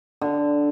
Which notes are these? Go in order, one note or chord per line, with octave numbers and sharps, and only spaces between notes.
D3